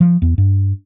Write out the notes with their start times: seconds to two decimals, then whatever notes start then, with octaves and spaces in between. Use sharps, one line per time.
0.01 F3
0.22 E2
0.38 G2